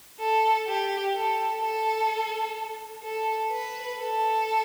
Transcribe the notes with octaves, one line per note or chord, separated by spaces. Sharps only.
A4
G4
A4
A4
A4
B4
A4